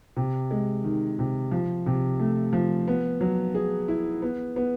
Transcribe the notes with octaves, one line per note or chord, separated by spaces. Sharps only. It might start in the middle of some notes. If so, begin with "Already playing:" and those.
C3
G#3
D#3
C3
F3
C3
A3
F3
B3
F#3
G#4
E4
B3
B3